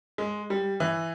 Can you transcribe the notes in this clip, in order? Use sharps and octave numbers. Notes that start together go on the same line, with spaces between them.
G#3
G3
E3